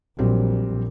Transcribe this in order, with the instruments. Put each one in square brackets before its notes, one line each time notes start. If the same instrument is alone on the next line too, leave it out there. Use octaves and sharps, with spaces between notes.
[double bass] A#1 [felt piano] F#3 G3 C4